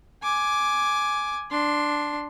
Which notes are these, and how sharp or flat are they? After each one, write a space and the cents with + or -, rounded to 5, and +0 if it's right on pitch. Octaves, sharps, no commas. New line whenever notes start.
G#5 +10 D6 +0
D4 +0 C6 +0